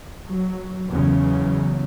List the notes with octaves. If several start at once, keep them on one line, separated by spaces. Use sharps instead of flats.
F#3
E2 C#3 F#3